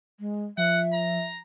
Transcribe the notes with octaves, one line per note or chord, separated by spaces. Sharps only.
G#3
F3 E5 F#5
A#5